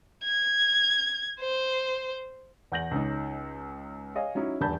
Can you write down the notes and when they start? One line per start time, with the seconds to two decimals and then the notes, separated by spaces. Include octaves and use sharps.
0.24 G#6
1.40 C5
2.72 E2 F#5 G6 A#6 F#7
2.91 C#2 C#4 D#4
4.15 C#5 D#5 F5 G#5
4.35 F#3 C#4 D#4 E4
4.61 D#1 E2 G2 A5 B5 G6